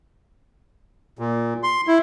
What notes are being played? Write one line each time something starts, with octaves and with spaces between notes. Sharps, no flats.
A#2
C6
E4